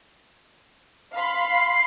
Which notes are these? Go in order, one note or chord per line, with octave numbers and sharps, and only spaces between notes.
F5 B5 C6 C7